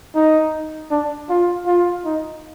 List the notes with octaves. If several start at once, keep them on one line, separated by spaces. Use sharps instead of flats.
D#4
D4
F4
F4
D#4